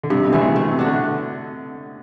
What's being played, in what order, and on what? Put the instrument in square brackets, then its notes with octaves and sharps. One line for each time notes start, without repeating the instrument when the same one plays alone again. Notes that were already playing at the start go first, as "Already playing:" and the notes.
[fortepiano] D3
[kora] G2 [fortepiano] C3
[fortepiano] C3
B2
[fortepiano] D3 [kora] E3 A3
[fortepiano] C3
[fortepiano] B2 [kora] A3
[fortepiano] C3
[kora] D4 F#4
[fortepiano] D3